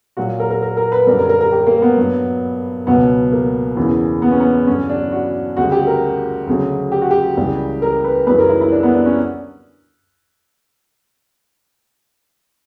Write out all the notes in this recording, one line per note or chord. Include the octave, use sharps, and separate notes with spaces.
A#2 F#3 F#4
A#4
A#4
A#4
A#4
B4
F#2 D3 G3 A#4
A#4
A#4
A#4
G4
A#3
B3
G2 F#3
C#2 B2 F#3 B3
A#3
E2 C#3 E3
B3
C#4
B3
G2 D3 F#3 C#4
D4
F#4
D2 C#3 G3 F#4
G4
A#4
D2 C#3 F#3
G4
F#4
G4
C#2 C#3 E3 G3
A#4
B4
F#2 C#3 E3 G3 B4
A#4
E4
E4
D4
B3
D4
C#4